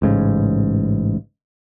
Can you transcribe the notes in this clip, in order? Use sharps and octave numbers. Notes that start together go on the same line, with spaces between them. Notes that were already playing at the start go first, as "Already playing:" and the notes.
A1 G#2 C#3